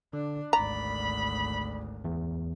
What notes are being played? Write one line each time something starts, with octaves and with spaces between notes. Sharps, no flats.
D3 D4
G#1 D2 D5 A#5 B5
E2